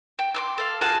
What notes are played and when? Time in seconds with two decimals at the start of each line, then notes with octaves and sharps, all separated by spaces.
0.19 G5
0.34 C6 D6 E6
0.58 A4 F5
0.81 F4 F#4 G#4 A5